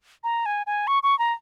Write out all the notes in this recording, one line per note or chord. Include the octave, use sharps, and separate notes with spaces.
A#5
G#5
G#5
C#6
C#6
A#5